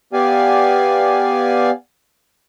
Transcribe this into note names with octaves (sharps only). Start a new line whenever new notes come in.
B3 G4 D5 F5 G#5